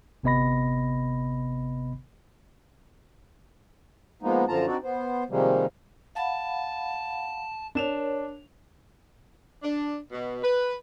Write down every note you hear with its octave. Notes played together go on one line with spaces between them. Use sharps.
G1 C3 B3 D#5 B5 A#6
F3 G#3 A#3 B3 D#4
F#2 D3 F3 F4 A5 A#5
C4 D4 D#4 F#4 D5
B3 C5
C3 D#3 F3 G3 G#3 A#3
F5 F#5 A5 B5
D4 A#4 C#5 E7 F7
D4
B2
B4